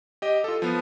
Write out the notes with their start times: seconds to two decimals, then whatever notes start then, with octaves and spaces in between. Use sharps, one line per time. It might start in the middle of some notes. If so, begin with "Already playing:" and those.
0.22 G4 D#5
0.44 F4 A4
0.62 F3 B3